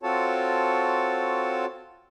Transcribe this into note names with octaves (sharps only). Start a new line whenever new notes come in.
C4 F4 F#4 A4 C#5 A5